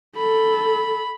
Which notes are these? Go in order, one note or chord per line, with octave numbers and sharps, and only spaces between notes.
A4 B5